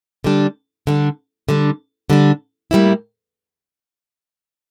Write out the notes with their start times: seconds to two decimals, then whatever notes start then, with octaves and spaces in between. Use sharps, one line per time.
0.24 D3 G3 D4
0.87 D3 G3 D4
1.49 D3 G3 D4
2.10 D3 G3 D4
2.71 A2 G3 A#3 E4